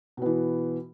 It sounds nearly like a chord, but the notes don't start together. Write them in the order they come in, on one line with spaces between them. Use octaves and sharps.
B2 B3 E3